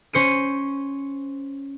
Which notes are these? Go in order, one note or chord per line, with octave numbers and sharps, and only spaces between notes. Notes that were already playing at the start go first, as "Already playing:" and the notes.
C#4 C5 C#7 D#7